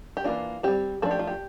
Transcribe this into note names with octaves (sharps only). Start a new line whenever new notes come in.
G4
E3 A#3 D4 F4
G3 C4 G4
F3 A3 D4 A4
G4
F4
G4